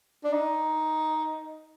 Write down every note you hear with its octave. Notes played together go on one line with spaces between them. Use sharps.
D4
D#4